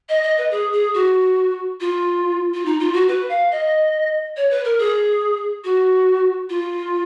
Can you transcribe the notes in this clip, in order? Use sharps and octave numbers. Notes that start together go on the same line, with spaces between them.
D#5
D#5
B4
G#4
G#4
F#4
F4
F4
D#4
F4
F#4
B4
F5
D#5
C#5
B4
A#4
G#4
F#4
F4